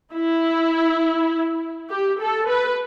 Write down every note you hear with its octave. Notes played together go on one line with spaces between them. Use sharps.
E4
G4
A4
B4